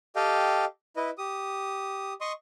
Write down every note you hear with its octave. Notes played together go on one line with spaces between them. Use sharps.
G4 A4 D#5 F5 G5
E4 B4 D#5
G4 D#6
D#5 C6 C#6 D#6